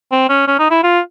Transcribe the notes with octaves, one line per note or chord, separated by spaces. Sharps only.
C4
C#4
C#4
D#4
E4
F4